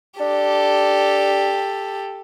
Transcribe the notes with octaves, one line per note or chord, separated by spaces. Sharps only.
D4 G4 A4